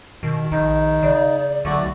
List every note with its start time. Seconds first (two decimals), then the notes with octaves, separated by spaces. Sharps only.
0.23 B2 D#3
0.52 A#1 D#4
1.03 C#3 D5
1.65 B1 D3 A3 F#4 D5